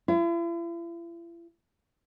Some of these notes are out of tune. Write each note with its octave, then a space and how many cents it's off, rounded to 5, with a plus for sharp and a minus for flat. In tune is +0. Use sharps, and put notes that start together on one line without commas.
E4 +45